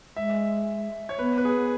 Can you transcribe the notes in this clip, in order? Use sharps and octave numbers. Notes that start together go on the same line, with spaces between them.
G#3 E5
C#5
B3 B4
B4
G#4